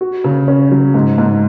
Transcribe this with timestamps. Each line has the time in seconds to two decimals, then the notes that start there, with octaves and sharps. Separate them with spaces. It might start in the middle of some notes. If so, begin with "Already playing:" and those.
0.01 F#4
0.24 C#3
0.48 C#4
0.72 F#3
0.94 G#2
1.18 G#2